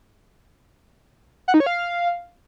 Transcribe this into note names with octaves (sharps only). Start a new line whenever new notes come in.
F#5
D#4
C#5
F5